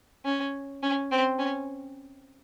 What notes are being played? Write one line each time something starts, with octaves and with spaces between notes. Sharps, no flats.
C#4
C#4
C4
C#4